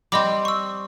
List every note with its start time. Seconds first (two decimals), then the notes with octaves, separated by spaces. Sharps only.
0.12 G3 C4 D#5 B5 D6
0.45 C#6 E6